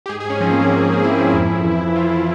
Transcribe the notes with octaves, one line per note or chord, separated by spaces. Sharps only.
G4
G#2 G#4
G#4
G#2 C#4
F3 C4
A#3
G#2
A#3
F3 C#4
A#3
F3
C4
G#2 E4
F3
F2
F2
E3
E3
E3 F4
E3